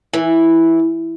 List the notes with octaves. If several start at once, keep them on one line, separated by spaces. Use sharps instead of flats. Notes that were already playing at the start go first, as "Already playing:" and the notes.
E3